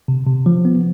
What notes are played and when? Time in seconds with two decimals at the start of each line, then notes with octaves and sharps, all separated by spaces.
0.08 C3
0.26 C3
0.46 F3
0.65 B3